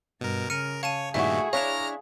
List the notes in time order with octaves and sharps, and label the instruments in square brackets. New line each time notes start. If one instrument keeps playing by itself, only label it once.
[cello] G2 [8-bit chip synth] B2 A#4
[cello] C#3 [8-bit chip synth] A#4 [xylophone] F6 C#7 D#7
[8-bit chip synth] C#5 [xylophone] F5 A5 D#7
[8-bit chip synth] G2 A#2 D#3 [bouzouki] A3 E4 F#4 [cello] G#4 [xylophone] E5
[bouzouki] D4 E4 C#5 [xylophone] F5 F7 [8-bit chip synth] A#5 F6 A#6